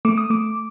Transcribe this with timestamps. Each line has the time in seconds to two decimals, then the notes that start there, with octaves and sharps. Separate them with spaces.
0.05 A3 D6
0.18 D#6
0.30 A3 D6